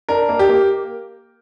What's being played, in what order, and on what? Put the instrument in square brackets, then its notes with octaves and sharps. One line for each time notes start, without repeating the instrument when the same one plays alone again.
[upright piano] D4 A#4
A#3
G4
A#3